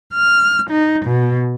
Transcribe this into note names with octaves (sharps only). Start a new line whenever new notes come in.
F6
D#4
B2